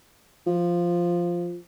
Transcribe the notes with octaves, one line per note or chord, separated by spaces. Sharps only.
F3